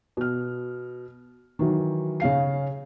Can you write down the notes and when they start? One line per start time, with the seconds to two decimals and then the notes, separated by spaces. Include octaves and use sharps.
0.17 B2 F6
1.59 D#3 E3 F#3
2.20 C#3 C#4 F5 C7